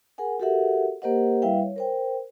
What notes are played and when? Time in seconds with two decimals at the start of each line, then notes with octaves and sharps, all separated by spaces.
0.18 G#4 A#4 F#5 G#5
0.40 F#4 G4 A4 A#4 E5 F#5
1.02 A#3 G4 A#4 C5 D#5 F#5
1.42 G3 E4 B4 E5 F5 G5
1.63 C#5
1.76 A#4 C5 G5